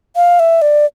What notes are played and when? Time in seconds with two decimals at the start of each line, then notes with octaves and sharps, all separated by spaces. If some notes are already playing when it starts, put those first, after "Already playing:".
0.16 F5
0.40 E5
0.62 D5